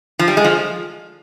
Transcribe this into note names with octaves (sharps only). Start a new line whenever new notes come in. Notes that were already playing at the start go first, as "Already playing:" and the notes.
F3
G3
G#3
F3